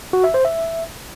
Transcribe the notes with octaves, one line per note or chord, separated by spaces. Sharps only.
F#4
E5
C5
E5